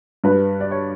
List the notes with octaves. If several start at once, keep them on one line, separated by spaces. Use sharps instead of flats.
G2 B4
D5
C#5